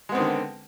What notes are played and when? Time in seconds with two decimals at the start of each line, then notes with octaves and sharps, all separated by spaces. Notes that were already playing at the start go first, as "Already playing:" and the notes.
0.09 G#3
0.12 B3
0.15 C4
0.18 D#3
0.21 D3